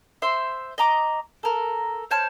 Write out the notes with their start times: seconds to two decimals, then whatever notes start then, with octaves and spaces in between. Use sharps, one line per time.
0.22 C5 E5 C6
0.78 D#5 A#5 D6
1.43 A4 A#4
2.11 C5 C#5 A5 F6